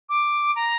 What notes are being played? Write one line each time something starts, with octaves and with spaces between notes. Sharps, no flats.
D6
A#5